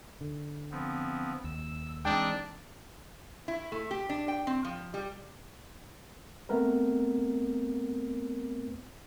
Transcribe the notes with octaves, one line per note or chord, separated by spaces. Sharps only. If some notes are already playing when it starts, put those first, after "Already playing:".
D3
F3 B3 C4
D#2 E6
E3 G#3 C4 D4 D#4 G5
E4
A3
G4
D4
G5
C4
F3
G3
A3 B3 C4 A#4 B4